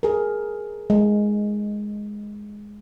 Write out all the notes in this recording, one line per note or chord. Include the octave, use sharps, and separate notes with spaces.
G#4 A#4
G#3